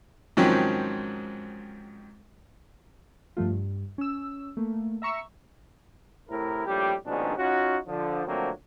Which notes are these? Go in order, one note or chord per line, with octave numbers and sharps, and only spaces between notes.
G#2 D#3 F3 F#3 C4 C#4
G2 F3 A3 F4
G2
C#4 E6
A3 A#3
E5 A#5 C#6 E6
A2 C3 E4 A#4
A#1 A2 G3 G4
A#1 G#2 B2 D#3 C#4 D4
C#4 D#4 F4 F#4
D3 F3
D3 F3 F#3 A3 A#3 C4